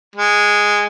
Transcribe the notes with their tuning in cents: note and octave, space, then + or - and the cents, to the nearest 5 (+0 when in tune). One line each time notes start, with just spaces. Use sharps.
G#3 -5